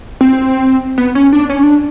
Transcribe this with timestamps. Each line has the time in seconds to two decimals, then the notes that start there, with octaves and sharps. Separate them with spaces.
0.21 C4
0.98 B3
1.15 C#4
1.33 D4
1.49 C#4
1.63 D4